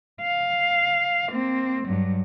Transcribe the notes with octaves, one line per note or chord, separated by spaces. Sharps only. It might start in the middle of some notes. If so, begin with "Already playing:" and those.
F5
A#3 C4
G2 F#3